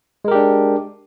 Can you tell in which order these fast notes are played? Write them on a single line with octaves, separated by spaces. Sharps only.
G#3 A#4 G4 D4